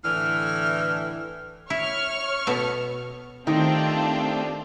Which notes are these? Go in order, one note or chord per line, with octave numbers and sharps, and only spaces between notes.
A2 D3 E3 F6
E4 C#5 C#6 F6
B2 B3 A4
D#3 A3 C4 D4 D#4 F4 G4